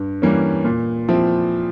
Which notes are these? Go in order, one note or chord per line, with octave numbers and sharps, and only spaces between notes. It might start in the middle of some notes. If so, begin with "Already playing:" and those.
Already playing: G2
E3 G3 A#3 C#4
A#2
F3 C4 E4